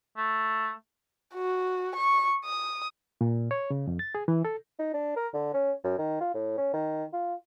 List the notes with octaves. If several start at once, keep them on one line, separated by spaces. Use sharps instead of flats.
A3
F#4
C#6
D#6
A#2
C#5
C#3
F2
A6
G#4
E3
A4
D#4
D4
A#4
D3
C#4
F#2
D#3
F4
A2
C#4
D#3
F4